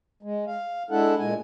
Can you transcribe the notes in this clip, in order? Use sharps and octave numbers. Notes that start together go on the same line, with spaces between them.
G#3
F5
G#3 D4 E4 A4 F#5
A#2 G#3 G#5